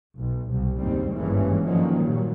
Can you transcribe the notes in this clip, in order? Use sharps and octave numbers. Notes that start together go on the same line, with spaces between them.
B1
C2
F#1 D#2 G#2 G3 C4
G#1 G2 E3 G#3 A#3 C#4
D3 D#3 F3 F#3 A#3 C#4
A#2 F#3 G3